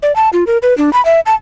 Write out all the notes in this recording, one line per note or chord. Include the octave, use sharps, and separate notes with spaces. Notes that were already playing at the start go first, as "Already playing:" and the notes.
D5
A5
F4
A#4
B4
D4
B5
E5
A5